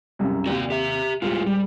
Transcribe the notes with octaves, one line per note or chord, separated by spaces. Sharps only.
C2 F#2 C#3
D#2 C3 F#4 D5
G4 E5
D#1 A2 G#3 F4
G3